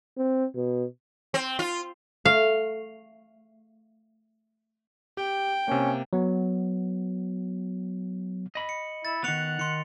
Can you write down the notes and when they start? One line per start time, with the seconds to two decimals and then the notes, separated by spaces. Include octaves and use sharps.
0.17 C4
0.55 B2
1.34 C4
1.59 F4
2.25 A3 F5
5.17 G4 G5
5.68 C3 A#3 C#4
6.13 F#3 B3
8.55 D#5 B5
8.69 C#7
9.05 E4 A6
9.24 D#3 B3 F#5 C#7 F7
9.59 D#3 C6 C#7